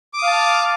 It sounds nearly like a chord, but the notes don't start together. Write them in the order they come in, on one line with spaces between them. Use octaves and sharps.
D6 D#6 F5 A5 F6